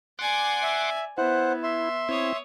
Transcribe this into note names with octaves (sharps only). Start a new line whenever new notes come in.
D5 F#5 G#5 C6 D6
E5
B3 E4 C5 F#5
E5 C6
C4 E4 C#5 D#6